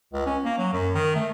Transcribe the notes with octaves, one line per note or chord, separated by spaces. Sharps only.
C#2
C#4
A#3
F#3
F#2
D#3
A3